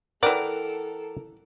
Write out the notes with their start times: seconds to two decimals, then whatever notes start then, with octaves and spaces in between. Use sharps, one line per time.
0.23 E3 A4 A#4 D5 F#5 G5